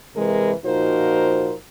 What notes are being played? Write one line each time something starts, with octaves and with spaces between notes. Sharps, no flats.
C3 E3 G#3 A#4 B4
A#2 F3 D#4 F#4 A#4 C5